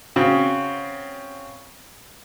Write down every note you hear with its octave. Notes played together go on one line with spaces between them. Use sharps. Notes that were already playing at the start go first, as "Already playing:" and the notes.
C#3 C4 F#4